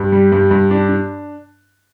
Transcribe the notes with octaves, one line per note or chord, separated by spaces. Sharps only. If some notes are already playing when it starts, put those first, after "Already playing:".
Already playing: G2
G3
G2
G2
D4
D4